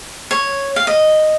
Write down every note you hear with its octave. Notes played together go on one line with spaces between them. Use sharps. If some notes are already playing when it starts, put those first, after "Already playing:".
C#5
F5
D#5